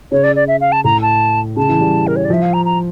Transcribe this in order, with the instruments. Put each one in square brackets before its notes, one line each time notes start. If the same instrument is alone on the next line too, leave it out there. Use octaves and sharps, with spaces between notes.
[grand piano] C#3 [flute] C#5
[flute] D5
D5
E5
F5
A5
[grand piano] A2 [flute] A#5
[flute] A5
[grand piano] C#3 [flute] A5
[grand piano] E3
G3
[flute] A#4
C#5
D5
[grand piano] F3 [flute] E5
[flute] F5
A#5
A#5